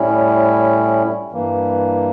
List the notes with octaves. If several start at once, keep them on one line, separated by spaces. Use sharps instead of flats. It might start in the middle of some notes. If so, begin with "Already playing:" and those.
Already playing: A2 G3 C#4 E4
G2 E3 A#3